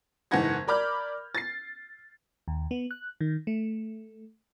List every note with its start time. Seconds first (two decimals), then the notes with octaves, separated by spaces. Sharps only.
0.31 F#1 G#2 E3 F#5 G#6 A#6
0.68 A#4 D5 B5 D6 F6 G6
1.35 A6 C7
2.48 D#2
2.71 B3
2.91 F#6
3.21 D#3
3.47 A3